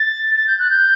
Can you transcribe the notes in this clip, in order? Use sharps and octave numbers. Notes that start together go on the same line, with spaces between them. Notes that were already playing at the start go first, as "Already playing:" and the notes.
Already playing: A6
A6
G6
F#6
G6